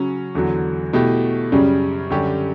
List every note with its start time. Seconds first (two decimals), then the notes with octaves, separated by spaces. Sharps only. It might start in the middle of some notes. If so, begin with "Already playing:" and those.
Already playing: C#3 F#3 C#4
0.35 E2 D3 F#3
0.93 B2 A3 E4 G4
1.52 F#2 C#3 G3 C#4
2.10 F#2 D3 G3 C#4 G4